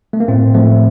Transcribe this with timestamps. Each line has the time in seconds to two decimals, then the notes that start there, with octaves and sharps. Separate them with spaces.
0.13 A3
0.20 A#3
0.28 A2 C4
0.54 F3 A3